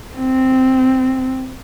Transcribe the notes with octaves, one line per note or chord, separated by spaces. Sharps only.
C4